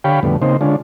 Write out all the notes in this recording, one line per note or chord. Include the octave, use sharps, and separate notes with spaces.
D3 G4 C#5 F5 G5 B5
F2 A2 D3 G3 B3
C#3 A#3 C4 D#4 C5
D3 G#3 C#4 D4 F4